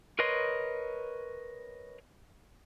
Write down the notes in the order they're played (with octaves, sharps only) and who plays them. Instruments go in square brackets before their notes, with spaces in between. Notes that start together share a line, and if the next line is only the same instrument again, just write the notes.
[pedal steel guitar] A#4 B4 C#5 D#5 C6